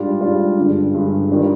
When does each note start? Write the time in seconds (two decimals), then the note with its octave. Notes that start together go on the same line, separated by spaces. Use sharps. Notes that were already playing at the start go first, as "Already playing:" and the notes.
Already playing: G#2 G3 D4 F4
0.21 G#2 G3 D4 F4
0.58 G2 D3 G#3
0.94 G2 D3 G#3
1.30 D#3 G3 D4 F4